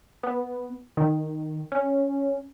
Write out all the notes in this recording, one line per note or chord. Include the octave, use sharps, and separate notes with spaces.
B3
D#3
C#4